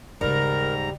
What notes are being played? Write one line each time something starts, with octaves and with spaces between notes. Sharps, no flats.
D#2 G#2 C#3 G3 A#4 A#5